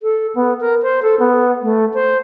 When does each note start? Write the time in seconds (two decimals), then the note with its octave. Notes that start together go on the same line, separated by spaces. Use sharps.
0.03 A4
0.35 B3
0.60 A#4
0.83 C5
1.02 A4
1.20 B3
1.62 A3
1.94 C5